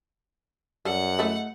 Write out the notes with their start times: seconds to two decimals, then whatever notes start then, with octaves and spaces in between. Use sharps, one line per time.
0.85 F#2 G3 A4 F#5
1.19 G#3 A3 E4